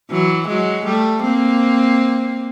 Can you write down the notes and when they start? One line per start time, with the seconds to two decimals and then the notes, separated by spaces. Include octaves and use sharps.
0.10 E3 F#3
0.48 F#3 G#3
0.85 G3 A3
1.22 A#3 C4